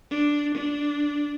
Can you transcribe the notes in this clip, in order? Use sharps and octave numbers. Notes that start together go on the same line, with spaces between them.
D4
D4